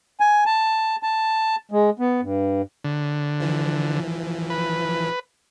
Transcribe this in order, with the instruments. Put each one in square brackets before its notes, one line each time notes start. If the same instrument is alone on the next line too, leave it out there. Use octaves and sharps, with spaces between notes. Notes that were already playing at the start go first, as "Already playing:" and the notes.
[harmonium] G#5
A5
A5
G#3
B3
G2
[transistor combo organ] D3
[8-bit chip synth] E3 F3
[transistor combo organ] B4